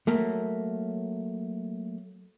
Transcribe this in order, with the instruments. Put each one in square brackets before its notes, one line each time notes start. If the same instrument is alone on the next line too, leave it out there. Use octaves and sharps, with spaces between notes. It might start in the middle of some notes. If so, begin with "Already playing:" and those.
[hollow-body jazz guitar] F#3 A3 A#3